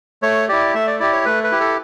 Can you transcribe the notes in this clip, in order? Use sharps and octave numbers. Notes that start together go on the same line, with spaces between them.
A3 C#5
E4 G4 D5
A3 E5
D5
E4 G4 D5
C#5
A3 B4
B4
E4 G4
A4